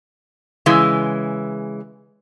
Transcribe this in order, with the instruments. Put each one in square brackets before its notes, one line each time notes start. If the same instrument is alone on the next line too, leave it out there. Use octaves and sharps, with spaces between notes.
[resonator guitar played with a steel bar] C#3 E3 G#3